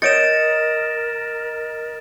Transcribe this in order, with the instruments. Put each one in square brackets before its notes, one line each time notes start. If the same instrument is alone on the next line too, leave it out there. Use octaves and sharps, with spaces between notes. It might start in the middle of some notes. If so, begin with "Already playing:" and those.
[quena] A#4 [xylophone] C#5 G6 C#7 [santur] D#5 [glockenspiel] A6 D7 E7